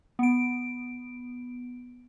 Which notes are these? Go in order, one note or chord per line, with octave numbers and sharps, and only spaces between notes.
B3 D7